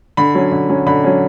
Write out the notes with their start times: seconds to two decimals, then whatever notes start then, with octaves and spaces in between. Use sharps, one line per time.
0.17 D3 B5
0.35 F#3 C#4
0.52 D3
0.69 F#3 C#4
0.87 D3 B5
1.04 F#3 C#4